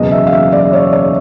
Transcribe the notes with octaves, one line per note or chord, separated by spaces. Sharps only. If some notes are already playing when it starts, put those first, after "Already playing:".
Already playing: F#1 E2 B2 F#3 D#5
E5
F5
E5
D5
C#5
C#5